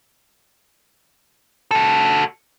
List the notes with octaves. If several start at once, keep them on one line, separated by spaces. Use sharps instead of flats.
F#4 A4